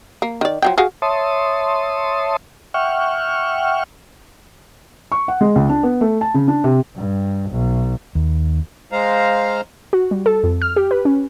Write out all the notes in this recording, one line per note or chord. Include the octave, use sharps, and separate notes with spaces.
A#3
D#3 D5
F3 F#3 G5
F#4 G#4 F5
C#5 E5 A5 C6 D#6
E5 F#5 G5 C#6 F6
C#6
F#5
G#3
C#2
D4
B3
A3
A5
C#3
D4
C3
G2
B1
D#2
G#3 C5 F5 A#5
F#4
G3
A4
F2
F6
G4
B4
C#4